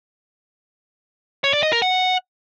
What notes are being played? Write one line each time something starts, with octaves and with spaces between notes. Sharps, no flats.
C#5
D5
D#5
A#4
F#5